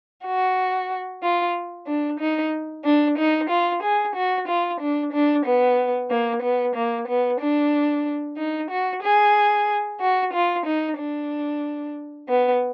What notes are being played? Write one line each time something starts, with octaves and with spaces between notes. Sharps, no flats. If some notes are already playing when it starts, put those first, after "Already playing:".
F#4
F4
D4
D#4
D4
D#4
F4
G#4
F#4
F4
D4
D4
B3
A#3
B3
A#3
B3
D4
D#4
F#4
G#4
F#4
F4
D#4
D4
B3